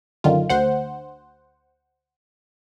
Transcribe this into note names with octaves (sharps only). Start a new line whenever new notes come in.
F#2 D3 D#3 F4
D2 C5 F#5